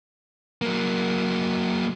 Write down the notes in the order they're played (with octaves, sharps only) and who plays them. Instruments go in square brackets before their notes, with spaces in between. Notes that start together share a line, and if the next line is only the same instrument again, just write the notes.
[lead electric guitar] F#3 A#3